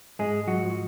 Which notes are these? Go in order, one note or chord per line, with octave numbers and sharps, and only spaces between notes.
G#2 G#3 G#4
F#3 F#4
F3